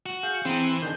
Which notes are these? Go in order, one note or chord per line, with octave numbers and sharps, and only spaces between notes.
F#4
G#4 F5 G6
E3 C4 G#4 A#5 C6
D#3 D4 G#4 G6